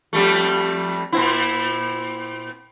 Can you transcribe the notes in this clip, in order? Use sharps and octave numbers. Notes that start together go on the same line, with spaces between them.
F2 G3 A3
A#2 C4 E4